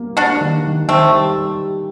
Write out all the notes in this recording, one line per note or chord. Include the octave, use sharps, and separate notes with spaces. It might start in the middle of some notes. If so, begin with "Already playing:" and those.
Already playing: G3 A#3
A#3 D4 F#4
D#3
D#3
D#3 A3 C4
G3
G3